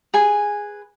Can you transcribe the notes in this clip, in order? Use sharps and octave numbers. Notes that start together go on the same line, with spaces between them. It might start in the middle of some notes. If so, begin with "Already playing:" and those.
G#4 B4 G#5